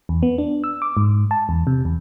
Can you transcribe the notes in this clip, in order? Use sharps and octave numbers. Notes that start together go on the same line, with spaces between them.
E2
B3
D4
E6
D6
G#2
A5
E2
C3
E2